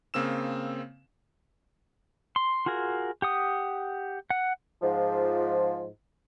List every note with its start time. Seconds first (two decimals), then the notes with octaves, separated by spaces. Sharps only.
0.14 C#3 A#3 C4 E6 E7
2.36 C6
2.66 F4 F#4 G#4 A#4
3.22 G4 F#5 D#6
4.30 F#5
4.82 G#2 F3